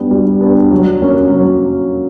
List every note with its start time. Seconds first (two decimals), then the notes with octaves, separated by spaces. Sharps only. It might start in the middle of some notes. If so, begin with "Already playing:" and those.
Already playing: G3 B3 D4 G4
0.11 G3
0.41 B3 D4 G4
0.71 F#3
1.02 A#3 C#4
1.31 F#3